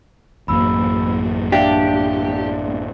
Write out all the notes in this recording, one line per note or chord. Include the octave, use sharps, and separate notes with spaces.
A1 F#2 A#3 B5 E6
D4 G4 D5 E5 F5